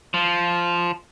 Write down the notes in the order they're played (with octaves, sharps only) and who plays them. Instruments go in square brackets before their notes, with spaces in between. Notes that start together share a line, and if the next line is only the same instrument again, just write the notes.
[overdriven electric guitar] F3